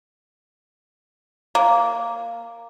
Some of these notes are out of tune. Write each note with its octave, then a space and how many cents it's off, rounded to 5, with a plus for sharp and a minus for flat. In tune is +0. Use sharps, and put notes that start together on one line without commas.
A#3 -5